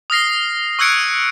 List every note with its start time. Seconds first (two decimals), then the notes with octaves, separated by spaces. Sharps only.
0.10 D#6 F6 A#6 C7
0.79 C#6 E6 F#6 G#6 C#7 D7